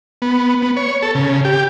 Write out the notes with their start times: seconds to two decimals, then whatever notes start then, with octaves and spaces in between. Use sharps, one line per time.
0.22 B3
0.62 B3
0.77 C#5
1.03 A4
1.15 C#3
1.45 G4